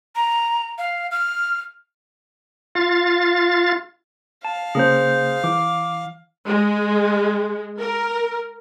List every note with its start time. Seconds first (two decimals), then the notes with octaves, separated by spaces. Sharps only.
0.15 A#5
0.78 F5
1.11 F6
2.75 F4 F5 A6
4.45 F5 A5
4.75 C#3 A#3 G#4 C5
5.44 E3 D6
6.47 G#3
7.78 A#4